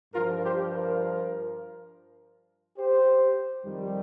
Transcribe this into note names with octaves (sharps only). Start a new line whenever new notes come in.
G2 F3 F4 A#4
G4 C5
F4 A#4
G4 C5
F2 D#3 G3